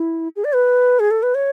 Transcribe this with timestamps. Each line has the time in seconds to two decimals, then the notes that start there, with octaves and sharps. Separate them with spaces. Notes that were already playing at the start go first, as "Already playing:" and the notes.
Already playing: E4
0.36 G#4
0.44 D5
0.53 B4
1.00 G#4
1.11 A4
1.23 B4
1.35 C#5